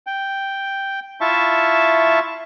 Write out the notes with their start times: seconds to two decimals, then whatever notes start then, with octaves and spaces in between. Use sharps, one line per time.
0.07 G5
1.21 E4 F4 E5 A5 C#6